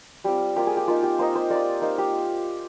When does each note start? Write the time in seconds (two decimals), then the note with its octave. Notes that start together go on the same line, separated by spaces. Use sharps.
0.24 G3 C4 F4 G4
0.56 A#3 F4 G4
0.67 G#4
0.77 G4
0.88 A#3 D#4 F4
1.03 G4
1.19 A#3 D#4 C5
1.35 C5
1.51 A#3 F4 D5
1.82 A#3 D#4 C5
1.98 G4